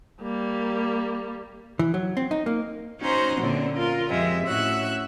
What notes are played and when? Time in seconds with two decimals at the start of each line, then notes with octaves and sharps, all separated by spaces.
0.22 G3 A#3
1.79 E3
1.94 F#3
2.17 C4
2.31 D#4
2.46 A#3
3.00 C#4 D#4 F#4 C5 A#5 C6
3.39 F#2 A#2 D3 C4 D4
3.75 F4 A#4
4.09 F2 C3 G#3 E5
4.45 A2 C#4 F#4 E5 E6 F#6